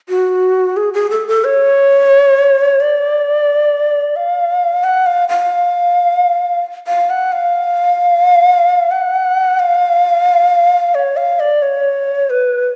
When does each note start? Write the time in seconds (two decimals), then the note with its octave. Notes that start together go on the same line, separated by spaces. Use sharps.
0.09 F#4
0.77 G#4
0.94 G#4
1.10 A4
1.28 A4
1.44 C#5
2.80 D5
4.16 F5
4.84 F#5
5.06 F5
5.29 F5
6.87 F5
7.10 F#5
7.32 F5
8.91 F#5
9.59 F5
10.95 C#5
11.17 F5
11.40 D5
11.62 C#5
12.30 B4